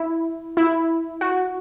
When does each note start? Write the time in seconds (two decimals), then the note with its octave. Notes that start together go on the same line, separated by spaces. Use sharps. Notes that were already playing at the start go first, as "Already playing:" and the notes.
Already playing: E4
0.57 E4
1.21 F#4